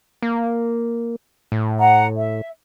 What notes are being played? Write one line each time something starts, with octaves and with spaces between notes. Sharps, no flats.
A#3
A2
F#5 A#5
E5